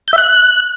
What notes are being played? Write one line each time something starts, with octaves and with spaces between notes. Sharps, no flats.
G6
E5
F#6